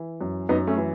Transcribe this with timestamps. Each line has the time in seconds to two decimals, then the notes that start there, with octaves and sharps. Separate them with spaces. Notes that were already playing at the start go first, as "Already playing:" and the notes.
Already playing: E3
0.21 F#2
0.49 F#2 B3 D#4
0.67 A3 C#4
0.77 E3